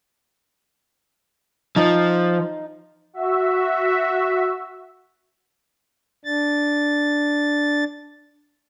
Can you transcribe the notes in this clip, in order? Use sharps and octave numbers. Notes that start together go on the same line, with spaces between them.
F3 D#4
F#4 E5
D4 A6